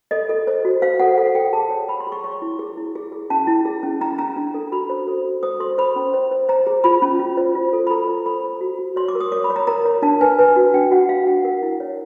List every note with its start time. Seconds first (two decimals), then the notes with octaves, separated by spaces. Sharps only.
0.11 A4 D#5
0.29 A4
0.47 C5
0.65 F#4
0.82 C5 F5
0.99 A4 F#5
1.18 A4 F#5
1.35 A4 G5
1.53 G#4 A5
1.70 C#5
1.89 G#4 B5
2.00 C6
2.07 G#4
2.12 C#6
2.24 C#5 C#6
2.42 E4
2.59 G#4
2.77 E4
2.95 G#4
3.12 G#4
3.30 C#4 A5
3.47 E4
3.65 G#4
3.83 C#4
4.01 C#4 A#5
4.19 C#4 A#5
4.37 D4
4.54 A4
4.72 F#4 B5
4.89 C5
5.08 A4
5.24 F#4
5.43 C5 D#6
5.60 A4 C6
5.78 C5 B5
5.96 C#4
6.14 C5
6.31 C5
6.49 C5 A#5
6.67 G#4
6.84 F4 B5
7.02 C#4
7.20 F4
7.37 C5
7.55 F4
7.73 A4
7.87 B5
7.91 A4 A#5
8.08 C5
8.26 A4 B5
8.44 C5
8.61 F#4
8.79 F#4
8.96 C#5 C6
9.08 D6
9.15 A#4
9.20 D#6
9.32 C#5 D6
9.44 B5
9.50 C#5
9.56 A#5
9.67 A#4 A#5
9.85 C#5
10.02 D4 A5
10.21 B4 G#5
10.38 B4
10.56 F#4
10.74 D4 G5
10.91 F#4 F#5
11.09 F#4 F5
11.27 D4 F#5
11.44 A#4 F#5
11.62 E4
11.80 C#5